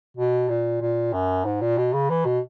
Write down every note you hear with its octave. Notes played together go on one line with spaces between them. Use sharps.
B2
A#2
A#2
F#2
G#2
A#2
B2
C#3
E3
B2